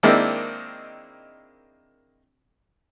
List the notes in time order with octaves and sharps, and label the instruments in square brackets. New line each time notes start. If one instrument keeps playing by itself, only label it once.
[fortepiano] D#3 G#3 A#3 C4 D4 E4